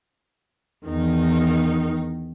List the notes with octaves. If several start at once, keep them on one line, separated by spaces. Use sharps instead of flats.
E2 D#3 D#4